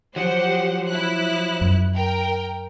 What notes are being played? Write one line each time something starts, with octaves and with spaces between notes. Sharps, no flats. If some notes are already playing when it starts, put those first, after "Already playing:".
F3 F#3 G4 C5 F#5
E4 F#6
F#2
A#4 G5